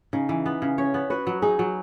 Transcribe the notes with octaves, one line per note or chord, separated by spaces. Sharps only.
C#3 D#4
E3
B3
C#3
C#4 C#5
B3
F#4 B4
F#3
D#4 G#4
F#3